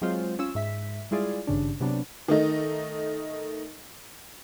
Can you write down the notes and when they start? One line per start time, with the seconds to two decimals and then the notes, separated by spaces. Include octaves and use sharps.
0.02 F#3 G#3 C4 F4 C5
0.39 C#4 F4 E6
0.55 G#2 E5 B6
1.11 G3 G#3 E4 F4 G#4 D5
1.47 G#1 G2 C#3 D4
1.81 C3 F#3 B3 D4
2.28 D#3 A3 D#4